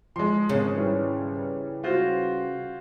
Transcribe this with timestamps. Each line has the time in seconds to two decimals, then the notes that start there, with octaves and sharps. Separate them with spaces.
0.16 F3 G#3 C6
0.49 G#1 C#3
0.75 E3 G3
1.83 F4 F#4 C5